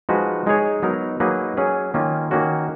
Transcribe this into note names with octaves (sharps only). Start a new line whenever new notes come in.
F3 G#3 D#4 F#4 B4
G#3 D#4 G#4 C#5
F#3 B3 D#4 A#4
F#3 A#3 D#4 G#4 B4
F#3 C#4 G#4
D#3 A#3 C#4 F4
D#3 A#3 C#4 F#4